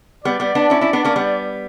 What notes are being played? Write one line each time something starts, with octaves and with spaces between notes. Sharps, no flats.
G3 B3 D5
G3 B3
B3 D4
C#4 E4
C#4 E4
B3 D4
A#3 C#4
G3 B3